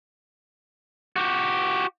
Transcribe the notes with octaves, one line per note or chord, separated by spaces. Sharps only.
F#4 G4